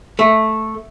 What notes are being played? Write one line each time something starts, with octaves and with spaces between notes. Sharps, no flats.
A3